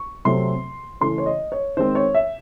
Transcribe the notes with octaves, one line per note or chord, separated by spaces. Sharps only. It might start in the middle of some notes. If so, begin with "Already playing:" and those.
Already playing: C#6
C3 F#3 A3 C4 C6
C#3 E3 A3 C#4 C6
C#5
D#5
C#5
D#3 G#3 C4 C5
C#5
E5